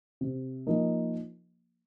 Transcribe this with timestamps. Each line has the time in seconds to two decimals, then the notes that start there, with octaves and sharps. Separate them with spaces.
0.21 C3
0.67 F3 A#3 D#4